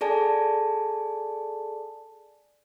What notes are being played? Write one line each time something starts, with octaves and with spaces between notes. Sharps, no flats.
G#4 A4 D5 G#5 A5